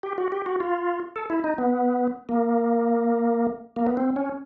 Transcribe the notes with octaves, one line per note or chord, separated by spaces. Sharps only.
G4
F#4
G4
F#4
F4
A4
E4
D#4
B3
A#3
A#3
B3
C4
C#4